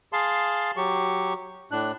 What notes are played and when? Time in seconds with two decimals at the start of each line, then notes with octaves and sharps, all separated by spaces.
0.13 G#4 F5 A5 C6
0.77 F#3 G4 C#6
1.71 A2 D4 F#6